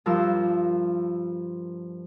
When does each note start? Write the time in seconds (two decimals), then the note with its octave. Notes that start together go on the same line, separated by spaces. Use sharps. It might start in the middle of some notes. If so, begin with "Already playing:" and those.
0.06 G2 F3 A#4 E6